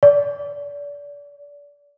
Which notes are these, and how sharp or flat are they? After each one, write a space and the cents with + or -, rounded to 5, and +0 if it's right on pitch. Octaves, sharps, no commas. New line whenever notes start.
D5 -30